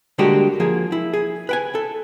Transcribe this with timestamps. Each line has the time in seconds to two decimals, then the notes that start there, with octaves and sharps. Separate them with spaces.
0.18 D3 G3 G#3 A#3 F#4 G4
0.60 F3 A#3 G#4
0.92 E4
1.14 G#4
1.49 B4 G5 G#5
1.75 A4